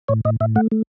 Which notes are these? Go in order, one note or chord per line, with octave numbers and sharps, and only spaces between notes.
A2 C#5
A2 D#5
A2 E5
A3 F#5
A3